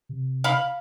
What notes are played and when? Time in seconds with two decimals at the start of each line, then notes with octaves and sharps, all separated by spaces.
0.09 C3
0.44 F5 B5